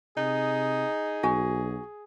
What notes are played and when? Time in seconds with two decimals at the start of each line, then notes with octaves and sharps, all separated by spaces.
0.17 C3 D#4 G#4
1.23 B1 F#4 G#5